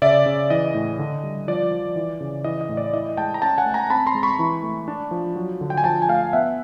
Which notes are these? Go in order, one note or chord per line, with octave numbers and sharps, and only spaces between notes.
C#3 D5 E5
C#3
E3 D#5
A2
D3
G3
F3 D5
F3
E3
C#3
E3 D#5
D#5
A2
D5
E4 D#5
G#3 G5 A5
A#5
C#4 G5 A5
F#5 G#5
A3
G#5 A#5
C4 A5 B5
A#5 C6
G#3
B5 C#6
E3
A3
D4
F3
F#3
D3
G5
G#5
F3 G5 A5
G#5
A3 F5 G5
B3 E5 F#5